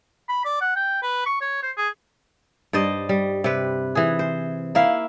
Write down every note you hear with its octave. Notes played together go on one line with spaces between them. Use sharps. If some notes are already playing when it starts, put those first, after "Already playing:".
B5
D5
F#5
G5
B4
C#6
C#5
C5
G#4
G2 C5 D5 D#5
G3
C3 B4
E3 G#4
C5
A#3 E4 E5 F5